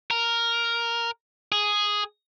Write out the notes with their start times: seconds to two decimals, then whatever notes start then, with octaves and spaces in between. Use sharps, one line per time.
0.11 A#4
1.52 G#4